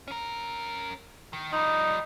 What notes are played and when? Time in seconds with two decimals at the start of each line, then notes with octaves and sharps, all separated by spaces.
0.08 C#4 A#4
1.33 D#3
1.52 F3 G3 D#4